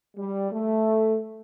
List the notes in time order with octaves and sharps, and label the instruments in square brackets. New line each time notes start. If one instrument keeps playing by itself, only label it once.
[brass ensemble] G3
A3